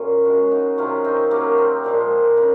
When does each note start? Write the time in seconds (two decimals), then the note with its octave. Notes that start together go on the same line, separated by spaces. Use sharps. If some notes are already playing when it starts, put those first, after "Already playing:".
Already playing: A#2 C#3 F#3 C#4 F4
0.25 C#3 G#3 F#4 A#4
0.51 D#4 F#4
0.78 C3 D#3 F#3 C#4 F4
1.04 C4 D#4
1.31 C3 F#3 A#3 C#4
1.58 C4
1.84 A#2 F3 G#3
2.37 C#3